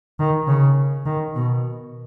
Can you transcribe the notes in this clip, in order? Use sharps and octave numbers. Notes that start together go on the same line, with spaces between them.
D#3
C#3
D#3
B2